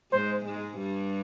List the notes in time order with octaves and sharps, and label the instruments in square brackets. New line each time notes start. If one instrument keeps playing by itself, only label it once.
[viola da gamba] G#2 G#3 [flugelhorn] C5
[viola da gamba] G#2 G#3
G2 G3